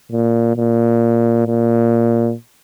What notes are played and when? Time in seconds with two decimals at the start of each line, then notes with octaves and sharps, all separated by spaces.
0.12 A#2
0.57 A#2
1.47 A#2